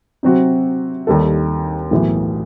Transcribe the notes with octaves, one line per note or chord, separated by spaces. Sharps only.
C3 F#3 C4 F#4
D#2 D#3 G3 D#4 A4
B1 A2 E3